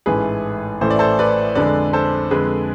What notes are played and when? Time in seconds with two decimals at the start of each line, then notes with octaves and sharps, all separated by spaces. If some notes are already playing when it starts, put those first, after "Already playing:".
0.06 A1 G#2 E3 A3 G#4 B4
0.81 A1 A2 E3 A3 C5
0.90 D5
0.99 A4 C5
1.19 B4 D5
1.55 F2 D3 G#3 B4 D5
1.93 A4 C5
2.31 F2 D3 G#3 G#4 B4